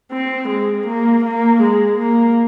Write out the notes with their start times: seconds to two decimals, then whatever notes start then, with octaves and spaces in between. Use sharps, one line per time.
0.12 C4
0.49 G#3
0.87 A#3
1.24 A#3
1.62 G#3
1.98 A#3